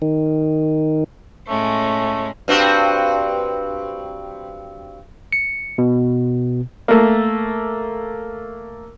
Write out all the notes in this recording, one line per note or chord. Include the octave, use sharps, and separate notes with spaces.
D#3
A2 G#3 A3 C#4
G2 C4 F#4
C#7
B2
A3 A#3